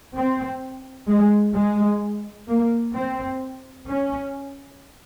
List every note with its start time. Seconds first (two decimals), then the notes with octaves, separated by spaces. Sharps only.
0.15 C4
1.08 G#3
1.55 G#3
2.49 A#3
2.94 C4
3.87 C#4